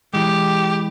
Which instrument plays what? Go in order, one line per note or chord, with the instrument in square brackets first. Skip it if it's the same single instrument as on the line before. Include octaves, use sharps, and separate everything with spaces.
[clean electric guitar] E3 G#3 [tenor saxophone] G4